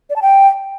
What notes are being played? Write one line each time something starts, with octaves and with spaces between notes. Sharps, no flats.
D5
A5
G5